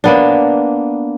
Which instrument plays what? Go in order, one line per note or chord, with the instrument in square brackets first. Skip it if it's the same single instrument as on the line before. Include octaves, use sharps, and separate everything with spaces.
[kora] A#3 B3 D4